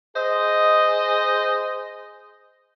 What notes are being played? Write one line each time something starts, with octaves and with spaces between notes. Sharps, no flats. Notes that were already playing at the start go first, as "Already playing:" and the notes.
G#4 C5 D#5